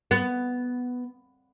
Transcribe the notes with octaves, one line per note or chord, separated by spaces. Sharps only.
B3